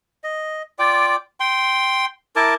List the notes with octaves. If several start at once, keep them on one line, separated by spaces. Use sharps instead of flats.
D#5
F4 D5 G5 D6
G5 C6
E4 A#4 A5 D6